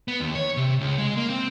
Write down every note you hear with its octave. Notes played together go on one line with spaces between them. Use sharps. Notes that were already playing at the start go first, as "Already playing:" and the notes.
B3
D#2
C#5
C3
C#2
G#3
A#3
C4